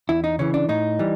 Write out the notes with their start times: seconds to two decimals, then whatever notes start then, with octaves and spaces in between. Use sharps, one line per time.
0.09 E2 E4
0.24 D#4
0.39 C#3 E3 C#4
0.54 D4
0.69 A2 D#4
0.99 E3 G3